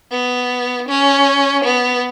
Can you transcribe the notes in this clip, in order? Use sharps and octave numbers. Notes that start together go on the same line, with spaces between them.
B3
C#4
B3